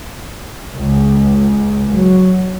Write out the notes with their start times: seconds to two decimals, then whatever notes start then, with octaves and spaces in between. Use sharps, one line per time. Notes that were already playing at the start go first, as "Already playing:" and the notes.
0.74 C#2
1.92 F#3